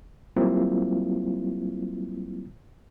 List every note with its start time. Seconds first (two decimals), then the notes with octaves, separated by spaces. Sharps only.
0.36 F#3 G3 A#3 C4 E4 F4